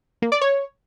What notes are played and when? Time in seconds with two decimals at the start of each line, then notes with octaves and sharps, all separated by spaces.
0.22 A#3
0.32 D5
0.41 C#5